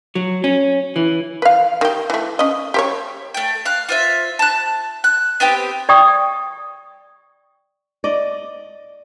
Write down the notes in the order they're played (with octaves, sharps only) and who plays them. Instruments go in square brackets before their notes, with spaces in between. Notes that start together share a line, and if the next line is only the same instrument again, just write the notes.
[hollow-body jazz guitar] F#3
C#4
E3
[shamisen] B4 F5
D#3 G4
E3 A3
C#4 D#5
G4 C5 C#5
[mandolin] A3 G5
F5 F#6
F4 C5 E5
A5 F#6
F#6
B3 C4 G4 G5
[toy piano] D5 G5 C#6 D#6
[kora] D5 D#5